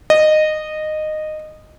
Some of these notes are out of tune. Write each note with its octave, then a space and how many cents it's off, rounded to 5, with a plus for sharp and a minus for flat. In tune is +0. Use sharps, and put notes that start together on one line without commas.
D#5 -15